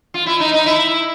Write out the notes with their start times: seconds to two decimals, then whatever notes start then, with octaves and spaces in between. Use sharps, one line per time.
0.14 F4
0.26 E4
0.40 D#4
0.53 D#4
0.66 E4